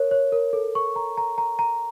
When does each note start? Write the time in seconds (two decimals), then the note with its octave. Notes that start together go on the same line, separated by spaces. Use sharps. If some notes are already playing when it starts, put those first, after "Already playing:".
Already playing: A#4 C#5
0.11 C#5
0.32 A#4
0.53 A4
0.75 C#6
0.96 A#5
1.17 A#5
1.38 A#5
1.59 A#5